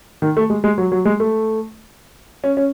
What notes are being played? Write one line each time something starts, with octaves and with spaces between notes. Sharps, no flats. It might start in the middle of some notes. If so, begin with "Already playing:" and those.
D#3
A3
G#3
G#3
F#3
F#3
G#3
A3
C#4
C#4